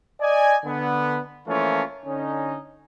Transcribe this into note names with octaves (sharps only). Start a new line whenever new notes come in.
D5 D#5 G#5
D3 B3
E3 F3 A3 A#3 C#4 F4
D3 C#4 D#4